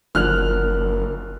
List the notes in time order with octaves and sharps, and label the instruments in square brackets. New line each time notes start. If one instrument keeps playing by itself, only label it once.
[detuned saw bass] F#1 [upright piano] D3 F3 [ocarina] A#4 [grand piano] F6 F#6 F7